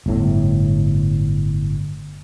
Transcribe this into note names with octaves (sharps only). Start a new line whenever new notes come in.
G1 A2